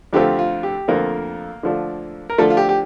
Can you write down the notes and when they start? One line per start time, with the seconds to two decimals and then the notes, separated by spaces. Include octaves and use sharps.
0.13 F2 D3 A3 C4 F4 G4
0.39 F4
0.63 G4
0.88 F2 D3 A3 A#3 C4 F4 A#4
1.63 D3 F3 A3 D4 F4
2.30 A#4
2.38 D3 F3 A3 D4 F4 A4
2.50 F4
2.57 G4
2.69 G4